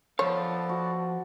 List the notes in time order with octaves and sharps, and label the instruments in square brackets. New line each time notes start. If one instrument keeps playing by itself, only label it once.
[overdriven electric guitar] F3 F5 [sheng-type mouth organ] B3 A4 D5 [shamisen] C#5
[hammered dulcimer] F#4